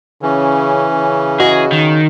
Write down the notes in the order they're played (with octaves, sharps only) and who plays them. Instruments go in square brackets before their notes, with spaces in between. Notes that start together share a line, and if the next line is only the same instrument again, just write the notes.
[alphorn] C#3 [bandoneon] E3 C#4
[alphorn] C#3
[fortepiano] F#4 D#5 [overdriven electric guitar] G#4
[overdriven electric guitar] D#3